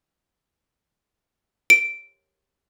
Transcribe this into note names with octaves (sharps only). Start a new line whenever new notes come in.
D7